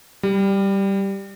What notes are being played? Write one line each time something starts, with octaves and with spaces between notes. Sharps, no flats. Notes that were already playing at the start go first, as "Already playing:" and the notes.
G3